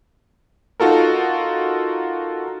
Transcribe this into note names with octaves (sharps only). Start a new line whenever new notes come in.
D#4 F4 F#4 A4 A#4